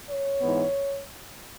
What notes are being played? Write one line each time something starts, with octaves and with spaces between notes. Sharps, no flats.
C#5
G#2 E3 B3